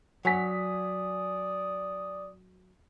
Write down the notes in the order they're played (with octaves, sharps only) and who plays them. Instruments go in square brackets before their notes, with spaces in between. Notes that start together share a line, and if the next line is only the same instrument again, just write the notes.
[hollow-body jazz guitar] F#3 [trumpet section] D5 D#6 [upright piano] F#5 G#5 B6